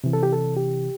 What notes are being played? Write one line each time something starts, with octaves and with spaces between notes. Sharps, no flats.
C3 E3
A4
G4
A4
G4